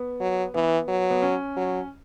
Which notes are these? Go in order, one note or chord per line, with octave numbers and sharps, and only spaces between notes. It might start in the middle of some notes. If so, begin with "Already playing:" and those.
Already playing: B3
F#3
E3 B3
F#3
B3
C#4
F#3